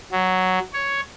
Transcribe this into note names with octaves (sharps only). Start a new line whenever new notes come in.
F#3
C#5